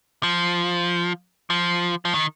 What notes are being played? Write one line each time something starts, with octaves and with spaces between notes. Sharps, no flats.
F3
F3
F3
D#3